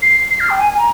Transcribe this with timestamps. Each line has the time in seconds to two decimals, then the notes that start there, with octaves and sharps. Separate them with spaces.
0.02 C7
0.30 C7
0.40 F6
0.49 G5
0.58 G#5
0.69 G#5
0.77 A#5